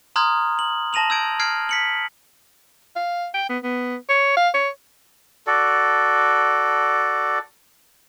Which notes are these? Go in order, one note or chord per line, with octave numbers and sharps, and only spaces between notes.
A#5 C6 D#6 F6 F#6 G#6
F#7
A5 A#6 D#7 F7 F#7
E6 G6 G#6 D7
F6 G#6 C7 D7
B6 C#7 F#7
F5
G5
B3
B3
C#5
F5
C#5
F#4 A4 D5